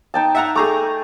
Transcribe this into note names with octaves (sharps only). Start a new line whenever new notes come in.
D#4 G5 A5
E5 F#5 A#5
A3 G#4 A#5 D6